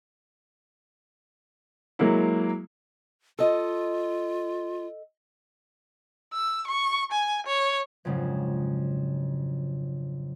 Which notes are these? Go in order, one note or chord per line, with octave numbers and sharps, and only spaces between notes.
F#3 G#3 A#3 E4
F4 A4 D#5
E6
C#6
G#5
C#5
F2 G#2 C#3 F#3 C#4 D4